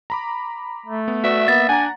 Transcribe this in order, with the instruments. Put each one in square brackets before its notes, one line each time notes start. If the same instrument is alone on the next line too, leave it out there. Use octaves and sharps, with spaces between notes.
[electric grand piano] A#5 B5 D6
[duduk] A3
[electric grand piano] B3
[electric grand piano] F#4 B4 D5 [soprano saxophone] E5
[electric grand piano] A#3 [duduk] B3 [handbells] A6
[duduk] D4 [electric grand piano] F#5 A#5 [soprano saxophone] G#5